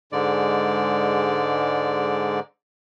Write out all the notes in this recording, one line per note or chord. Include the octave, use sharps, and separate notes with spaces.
G#2 D3 G#3 D5